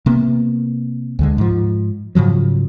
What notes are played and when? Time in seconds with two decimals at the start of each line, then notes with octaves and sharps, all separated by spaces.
0.06 C3 A#3 B3
1.19 D2 D3 G#3
1.38 G#2 F3
2.15 G#2 C#3 F3 F#3